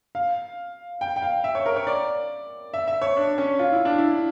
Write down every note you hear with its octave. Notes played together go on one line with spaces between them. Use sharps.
F5
G5
G5
F5
E5
C#5
A#4
C#5
D5
E5
E5
C#5
D4
C#4
F4
E4
D4
E4